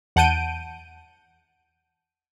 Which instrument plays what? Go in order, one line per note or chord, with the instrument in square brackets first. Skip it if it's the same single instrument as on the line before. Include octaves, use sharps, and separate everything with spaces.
[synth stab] E2 F#5 A5 G6 D7 D#7